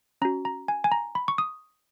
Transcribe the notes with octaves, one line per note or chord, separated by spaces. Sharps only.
C#4 F#4 A#5
A#5
G#5
G#5
A#5
B5
C#6
D#6